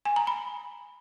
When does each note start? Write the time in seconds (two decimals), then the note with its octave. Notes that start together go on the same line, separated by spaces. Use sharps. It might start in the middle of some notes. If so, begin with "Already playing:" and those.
0.05 G#5
0.16 A#5
0.27 B5